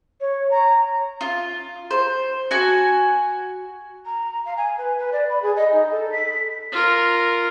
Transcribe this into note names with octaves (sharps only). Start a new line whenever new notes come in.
C#5
A#5
F4
C5
F#4 G#5
A#5
F5
G#5
B4
B4
D5
B5
G#4
D#5
D#4
A4
B6
F4 A#4